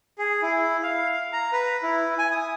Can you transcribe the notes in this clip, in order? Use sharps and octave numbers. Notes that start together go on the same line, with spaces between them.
G#4
E4
F5
A#5
B4
E4
G#5
D#6